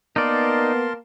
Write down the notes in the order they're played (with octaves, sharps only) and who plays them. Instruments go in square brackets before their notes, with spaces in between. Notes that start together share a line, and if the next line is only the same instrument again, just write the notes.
[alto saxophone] A#3 [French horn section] B3 [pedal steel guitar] D#4 D5 [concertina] A#4 A5 C6